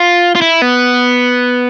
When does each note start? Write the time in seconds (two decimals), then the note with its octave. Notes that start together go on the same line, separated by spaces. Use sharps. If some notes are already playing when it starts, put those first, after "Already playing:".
Already playing: F4
0.35 F4
0.41 E4
0.62 B3